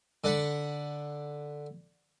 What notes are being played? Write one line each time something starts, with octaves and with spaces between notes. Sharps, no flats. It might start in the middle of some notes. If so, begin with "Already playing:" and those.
D3 D5 F#5 B5